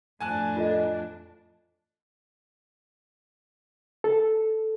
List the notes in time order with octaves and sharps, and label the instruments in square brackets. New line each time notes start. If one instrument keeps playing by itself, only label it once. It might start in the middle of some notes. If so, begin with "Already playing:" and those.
[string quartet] F2 A2 D4 [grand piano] G#5 A5 F#6
[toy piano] F4 A4 D#5
[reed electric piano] A4